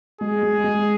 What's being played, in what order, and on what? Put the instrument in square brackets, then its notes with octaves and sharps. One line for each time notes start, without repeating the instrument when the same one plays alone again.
[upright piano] G#3 [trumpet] G#4
[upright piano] G#3
G#3